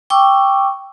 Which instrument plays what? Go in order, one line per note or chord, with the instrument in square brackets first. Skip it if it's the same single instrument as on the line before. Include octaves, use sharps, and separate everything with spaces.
[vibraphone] G5 C#6 D6 E6